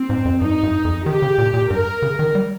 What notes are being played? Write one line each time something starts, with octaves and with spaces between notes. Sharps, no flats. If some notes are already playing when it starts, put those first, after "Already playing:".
Already playing: C4
G#2
F2
G2 D#4
G2
F2
D#3 G4
C#3
A#2
A#2
G2 A#4
C#3
D#3
G3